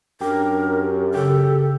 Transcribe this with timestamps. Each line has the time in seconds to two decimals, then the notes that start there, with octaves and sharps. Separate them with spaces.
0.21 F#2 D4 G4 A#4
1.14 C#3 G4 A4